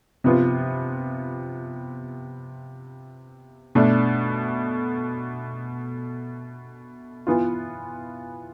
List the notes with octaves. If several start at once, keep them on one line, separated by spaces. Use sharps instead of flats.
C3 F3 B3 F4
B2 A3 D4
E3 B3 F4